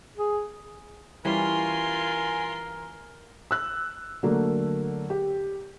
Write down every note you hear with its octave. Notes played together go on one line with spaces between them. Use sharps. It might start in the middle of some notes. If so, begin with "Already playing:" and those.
G#4
E3 G3 C#4 F4 A#4 G#5 C6
E6 F#6
D3 F#3 A3 A#3
G4